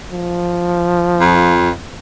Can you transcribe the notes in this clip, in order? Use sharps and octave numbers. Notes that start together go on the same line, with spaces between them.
F3
F2